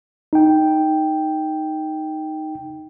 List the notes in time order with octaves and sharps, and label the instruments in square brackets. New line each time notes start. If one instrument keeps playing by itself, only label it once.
[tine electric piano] D#4 G5